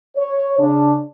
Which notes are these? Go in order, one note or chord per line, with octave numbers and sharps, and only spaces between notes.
C#5
C#3 D4